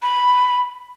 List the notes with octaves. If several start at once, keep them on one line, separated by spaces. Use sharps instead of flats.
B5